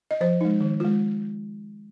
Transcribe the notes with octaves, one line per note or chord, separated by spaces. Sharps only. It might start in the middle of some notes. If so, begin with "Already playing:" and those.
D#5
F3 C5
G#3 D#4
D#3
G#3 F4